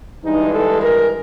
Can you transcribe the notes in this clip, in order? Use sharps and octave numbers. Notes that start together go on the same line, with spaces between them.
G2 E3 G#3 D#4
A4
A#4